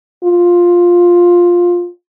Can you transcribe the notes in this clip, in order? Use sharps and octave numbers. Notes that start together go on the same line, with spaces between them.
F4